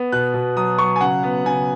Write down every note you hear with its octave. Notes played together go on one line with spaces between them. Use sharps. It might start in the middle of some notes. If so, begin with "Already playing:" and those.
Already playing: B3
B2 F#6
B2
F#3 D#6
F#3 C#6
G#5
C#3 F#5
B3
C#3 G#5